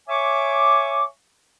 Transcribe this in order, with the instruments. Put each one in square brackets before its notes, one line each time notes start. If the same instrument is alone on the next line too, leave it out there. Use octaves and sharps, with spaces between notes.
[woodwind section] C#5 E5 G#5 C#6 D6